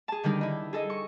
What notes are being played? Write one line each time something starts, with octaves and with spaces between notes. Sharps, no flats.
G#4 A5
D3 D#3 G3 D#4
D#4 E4
G#4 A4 D#5
C#6